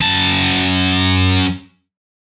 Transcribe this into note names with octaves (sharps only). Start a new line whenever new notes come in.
F#2 A5